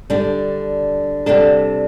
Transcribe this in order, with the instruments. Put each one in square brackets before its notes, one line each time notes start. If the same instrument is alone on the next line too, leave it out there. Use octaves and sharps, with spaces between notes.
[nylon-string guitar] D3 G3 D4
C3 G3 D4 A4